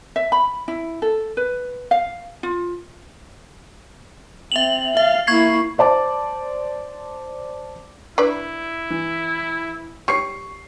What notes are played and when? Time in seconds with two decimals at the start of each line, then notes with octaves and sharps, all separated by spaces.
0.16 E5
0.32 B5
0.68 E4
1.02 A4
1.37 B4
1.91 F5
2.43 F4
4.52 C4 E5 F7 F#7
4.97 E5 F5
5.27 A#3 E4 C#6 G#6 C7
5.78 C5 D5 A5 D6
8.18 D4 E4 B4 D5
8.90 E3
10.08 G3 C#5 C#6 C7